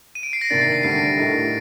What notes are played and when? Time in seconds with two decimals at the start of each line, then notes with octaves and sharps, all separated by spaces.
0.15 D#7
0.23 D7
0.33 C7
0.41 A#6
0.50 C3 D#3 A#3 D4 A6
0.61 C7
0.72 D7
0.83 D2 D3 G3 C7
1.17 A2 A3 D#4 A#4